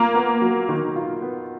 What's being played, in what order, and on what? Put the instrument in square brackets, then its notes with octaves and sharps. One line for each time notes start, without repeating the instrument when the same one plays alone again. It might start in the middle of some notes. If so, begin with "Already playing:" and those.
Already playing: [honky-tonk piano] A#3 [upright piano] F4
[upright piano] B3
F#3
D#3
F4
B3